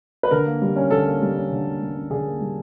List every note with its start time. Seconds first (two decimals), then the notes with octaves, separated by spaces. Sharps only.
0.23 B4
0.31 D3 A#4
0.46 A#3
0.62 G3
0.76 C#4
0.91 D3 A4
1.06 A#3
1.21 G3
1.36 C#4
1.51 D3
1.66 A#3
1.81 G3
1.95 C#4
2.10 D3 G#4
2.26 A#3
2.40 G3